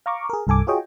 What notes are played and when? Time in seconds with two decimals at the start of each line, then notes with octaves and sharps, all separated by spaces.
0.06 F5 A#5 C#6 D6
0.30 G#4 A#4
0.47 C2 G2 A4 G#5 D6
0.67 F4 F#4 G#4 C#5 D#5 G5